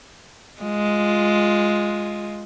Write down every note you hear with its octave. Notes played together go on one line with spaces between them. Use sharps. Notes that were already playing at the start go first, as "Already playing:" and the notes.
G#3 F4